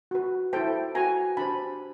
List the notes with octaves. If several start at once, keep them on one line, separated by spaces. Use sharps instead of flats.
F#4 B4
E4 A4 C5 G5 A5
F#4 B4 G#5 A#5
D4 G4 C5 A5 B5